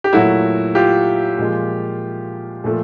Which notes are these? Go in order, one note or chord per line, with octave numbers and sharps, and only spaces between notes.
G4
A#2 F#3 A3 E4 F#4
F4 G4
A#2 F3 G#3
A#2 F3 A3